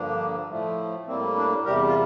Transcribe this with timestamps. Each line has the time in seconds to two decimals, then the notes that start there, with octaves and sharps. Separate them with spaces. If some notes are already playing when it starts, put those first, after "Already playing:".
Already playing: G2 D3 F3 A#3 D4
0.48 A2 F3 A3
1.07 A2 G3 A#3 C4
1.36 D4
1.65 E2 C3 G3 G4 A#4
1.87 F4